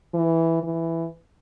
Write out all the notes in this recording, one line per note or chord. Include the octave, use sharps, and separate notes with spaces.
E3
E3